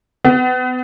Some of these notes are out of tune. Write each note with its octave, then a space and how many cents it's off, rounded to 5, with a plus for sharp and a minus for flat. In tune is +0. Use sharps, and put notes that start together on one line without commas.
B3 +30